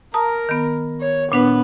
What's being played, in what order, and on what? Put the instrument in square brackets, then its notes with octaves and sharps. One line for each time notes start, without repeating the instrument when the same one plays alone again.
[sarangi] A#4 [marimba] A5 A#5 D#6
[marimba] D#3 B3
[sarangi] C#5
[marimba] A#2 D4 B4 [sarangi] B3